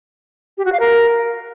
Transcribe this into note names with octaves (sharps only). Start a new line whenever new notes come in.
G4
F#4
F5
A#4